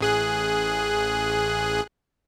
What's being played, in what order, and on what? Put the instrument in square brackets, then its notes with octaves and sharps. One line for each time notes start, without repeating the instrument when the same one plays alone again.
[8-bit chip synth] A1 G#4 F#6